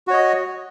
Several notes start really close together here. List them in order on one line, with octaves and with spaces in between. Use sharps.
F#4 C#5 D#5